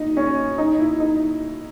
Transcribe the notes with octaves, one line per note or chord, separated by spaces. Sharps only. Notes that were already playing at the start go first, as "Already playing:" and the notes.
Already playing: D#4
C#4
D#4
E4
D#4